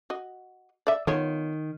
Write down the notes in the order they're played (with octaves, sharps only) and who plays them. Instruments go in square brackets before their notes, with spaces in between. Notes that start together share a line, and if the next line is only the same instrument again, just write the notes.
[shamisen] F#4 D#5
D5 E5
[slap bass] D#3 [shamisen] B3 F4 C#5